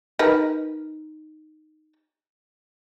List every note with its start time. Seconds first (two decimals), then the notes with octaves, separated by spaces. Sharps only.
0.19 D#4 A#4 B4